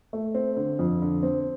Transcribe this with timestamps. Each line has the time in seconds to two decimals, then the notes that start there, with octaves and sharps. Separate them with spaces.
0.13 A3
0.35 C4
0.57 D3
0.79 F2
1.02 D3
1.23 C4